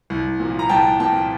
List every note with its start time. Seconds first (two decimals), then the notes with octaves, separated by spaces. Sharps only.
0.10 C2
0.40 A#2 F3
0.59 A#5
0.69 C2 G5 A5
1.00 A#2 F3 G5 A5